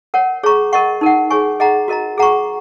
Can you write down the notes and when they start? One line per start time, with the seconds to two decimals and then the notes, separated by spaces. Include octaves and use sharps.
0.14 A#4 C#5 F#5
0.43 G#4 C#5 A#5 C#6
0.73 A#4 D#5 F#5 C#6
1.01 D#4 A#4 F#5
1.30 G#4 C#5 G#5 C#6
1.60 G#4 D#5 F#5 A#5
1.88 F#4 A#4 D#5 A#5
2.18 G#4 F#5 A#5 C#6